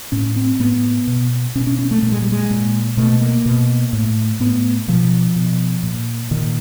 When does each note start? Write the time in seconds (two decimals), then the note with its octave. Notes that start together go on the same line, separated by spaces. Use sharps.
0.12 A2 C#4
0.36 C4
0.60 A2 B3
1.07 B2
1.55 B2 C#4
1.67 C#4
1.79 C#4
1.91 A3
2.02 A#2 A3
2.12 G#3
2.22 G3
2.32 G#3
2.51 A#2
2.97 B2 A3
3.22 A#3
3.46 B2
3.93 A2
4.40 A2 B3
4.88 B2 F3
5.36 B2
5.83 A#2
6.31 A#2 D#3